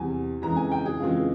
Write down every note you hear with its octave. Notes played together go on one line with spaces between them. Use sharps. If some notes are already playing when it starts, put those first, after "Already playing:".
Already playing: E2 C3 G3 G#5
F2 C#3 E3 G#3 A#5
G#5
G5
G#4
F2 C#3 E3 G#3 F4